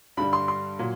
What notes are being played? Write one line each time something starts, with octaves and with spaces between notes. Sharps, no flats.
G2 D3 G3 B5
C6
C6
A#2 F#3